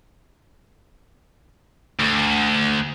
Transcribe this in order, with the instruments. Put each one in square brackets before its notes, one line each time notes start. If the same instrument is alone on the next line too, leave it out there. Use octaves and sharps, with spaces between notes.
[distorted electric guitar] D2